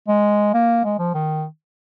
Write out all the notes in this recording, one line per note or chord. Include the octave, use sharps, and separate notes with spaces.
G#3
A#3
G#3
F3
D#3